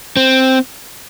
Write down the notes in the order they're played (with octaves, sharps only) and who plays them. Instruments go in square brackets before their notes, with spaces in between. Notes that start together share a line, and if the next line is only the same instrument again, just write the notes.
[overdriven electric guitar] C4